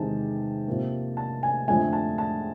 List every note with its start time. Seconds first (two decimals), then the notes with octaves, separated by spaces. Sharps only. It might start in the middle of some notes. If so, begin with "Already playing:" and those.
Already playing: E2 C3 D#3 G#3 A5
0.68 C3 F3 A#3
1.17 A5
1.43 G#5
1.68 F2 D3 F3 A3 G#5
1.93 A5
2.18 A5